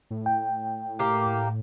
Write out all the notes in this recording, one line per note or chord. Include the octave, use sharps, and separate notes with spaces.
A2
G5
A#3 G4